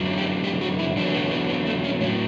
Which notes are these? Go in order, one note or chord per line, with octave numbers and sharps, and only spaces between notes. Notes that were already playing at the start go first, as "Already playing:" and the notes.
Already playing: F#2 D3 F#3
G4
G4
F#4
E4
E2 D3 F#3 D4
B3
B3
B3
A3
C#4
A2 F#3 C#4